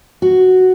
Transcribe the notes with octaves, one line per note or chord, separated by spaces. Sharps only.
F#4